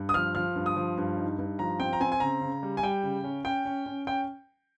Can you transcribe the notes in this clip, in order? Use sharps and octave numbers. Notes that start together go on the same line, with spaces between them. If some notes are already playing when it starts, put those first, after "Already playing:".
Already playing: G2
D#6
F3 F6
F3 F6
G2
D#6
F3
G2
D#4
G2
F3 A#5
C4 G5
A#5
C4 G#5
G#5
C#3 A#5
C#3
G3
G#5
G3 G5
C#3
C#4
C#4 G5
C#4
C#4
C#4 G5